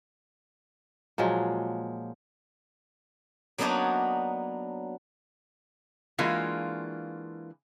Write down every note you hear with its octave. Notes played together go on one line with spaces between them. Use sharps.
A#2 F3 F#3 G#3
F#3 A#3 B3 D4 D#4 C#5
E3 G#3 A#3 D4 F4 F#4